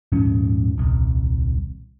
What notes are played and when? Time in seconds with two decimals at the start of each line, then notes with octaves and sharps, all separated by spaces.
0.12 D#1 G#2 F3 C#4
0.78 D#1 C2